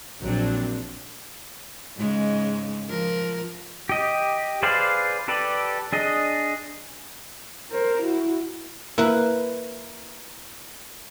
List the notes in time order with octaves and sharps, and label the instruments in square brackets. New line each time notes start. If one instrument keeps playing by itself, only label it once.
[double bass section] A#1 [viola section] F#3 C4 D4
[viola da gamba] G#2 C#3 G#3
F3 A#4
[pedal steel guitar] G4 D#5
G#4 B4 C5 D5 F5
G4 A4 B4 D5
D4 G#4 D#5
[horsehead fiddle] A#4 C5
E4 F#4
[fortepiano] A#3 [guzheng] E4 B4